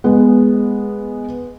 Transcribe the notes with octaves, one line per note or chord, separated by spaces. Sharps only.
G#3 B3